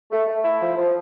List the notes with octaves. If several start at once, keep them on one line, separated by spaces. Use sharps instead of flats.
A3
A3
E4
F3
F3